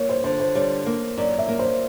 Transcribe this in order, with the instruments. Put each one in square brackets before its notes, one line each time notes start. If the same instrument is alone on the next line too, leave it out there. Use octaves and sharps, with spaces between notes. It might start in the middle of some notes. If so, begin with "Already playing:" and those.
Already playing: [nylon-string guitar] A#3 [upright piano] C#5
[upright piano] C5
[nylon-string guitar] D3 [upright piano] C5
[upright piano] C5
[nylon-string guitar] G3 [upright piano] C#5
[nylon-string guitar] A#3
[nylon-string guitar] F#2 [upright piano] D5
[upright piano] E5
[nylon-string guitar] A#3
[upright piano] C5